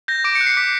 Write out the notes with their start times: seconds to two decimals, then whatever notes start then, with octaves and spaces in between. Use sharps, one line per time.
0.08 G6 A#6
0.24 D6 D7
0.35 C#7
0.41 F#6
0.47 C7
0.57 D6 B6